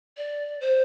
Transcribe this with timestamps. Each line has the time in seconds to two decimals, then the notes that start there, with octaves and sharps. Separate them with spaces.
0.17 D5
0.61 C5